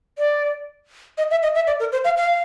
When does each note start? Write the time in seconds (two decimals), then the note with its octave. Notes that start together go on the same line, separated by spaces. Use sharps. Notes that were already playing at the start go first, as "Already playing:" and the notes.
0.18 D5
1.18 D#5
1.31 E5
1.43 D#5
1.55 E5
1.67 D5
1.80 A#4
1.92 C5
2.04 F5
2.17 F5